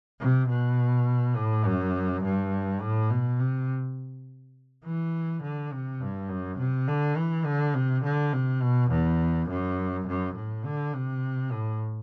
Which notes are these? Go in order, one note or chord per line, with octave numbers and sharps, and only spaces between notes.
C3
B2
A2
F#2
G2
A2
B2
C3
E3
D3
C3
G2
F#2
C3
D3
E3
D3
C3
D3
C3
B2
E2
F#2
F#2
A2
D3
C3
A2